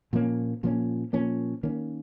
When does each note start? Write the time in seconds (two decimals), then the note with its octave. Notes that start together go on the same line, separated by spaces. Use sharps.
0.13 A#2 F3 A#3 C#4
0.63 A#2 F3 A#3 C#4
1.13 A#2 F3 A#3 C#4
1.63 D#3 A#3 C#4